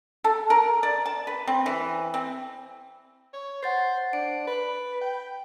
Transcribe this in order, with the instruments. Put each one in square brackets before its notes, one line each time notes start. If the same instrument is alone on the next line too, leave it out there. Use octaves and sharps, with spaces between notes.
[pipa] A4
A#4
D5
A5
B4
C4
E3
C4
[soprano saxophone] C#5
[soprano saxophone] C5 [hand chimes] F#5 A6 C7
[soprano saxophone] D4 [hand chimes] D7
[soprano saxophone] B4
G5